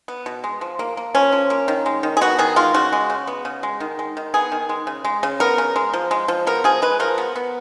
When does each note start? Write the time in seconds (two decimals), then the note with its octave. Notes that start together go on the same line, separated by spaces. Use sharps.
0.08 B3
0.26 B2
0.44 G#3
0.61 F3
0.79 A#3
0.97 A#3
1.15 F3 C#4
1.32 F3
1.50 A#3
1.68 D#3
1.86 G#3
2.03 D#3
2.17 G#4
2.21 B3 F#4
2.39 D#3 G#4
2.56 G#3 F4
2.74 C#3 F#4
2.92 G#3
3.10 C#3
3.27 B3
3.45 C#3
3.63 G#3
3.80 D#3
3.99 G#3
4.17 D#3
4.34 B3 G#4
4.52 D#3
4.69 G#3
4.87 C#3
5.05 G#3
5.23 C#3
5.40 B3 A#4
5.58 C#3
5.76 G#3
5.93 F3
6.11 G#3
6.28 F3
6.47 B3 A#4
6.64 F3 G#4
6.82 G#3 B4
7.00 F3 A#4
7.18 B3
7.36 B3